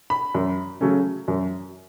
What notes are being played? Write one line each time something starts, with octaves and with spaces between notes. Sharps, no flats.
B5
F#2
C#3 F#3 A3 C#4
F#2